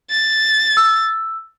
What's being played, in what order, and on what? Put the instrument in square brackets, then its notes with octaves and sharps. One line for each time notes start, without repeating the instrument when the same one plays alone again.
[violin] A6
[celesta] E6